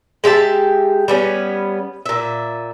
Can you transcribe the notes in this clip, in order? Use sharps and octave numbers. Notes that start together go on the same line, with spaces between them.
G#3 G4 E5 A5
G3 B3 C#4
A#2 E5